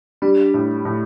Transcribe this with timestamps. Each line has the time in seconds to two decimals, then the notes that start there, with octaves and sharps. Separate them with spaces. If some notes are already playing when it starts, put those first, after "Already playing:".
0.22 G3 D4
0.54 A2
0.85 A2